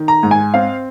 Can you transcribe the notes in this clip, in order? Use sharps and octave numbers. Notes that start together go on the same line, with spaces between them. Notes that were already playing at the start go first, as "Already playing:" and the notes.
Already playing: D#3
A#5
G#2
G#5
C4 F5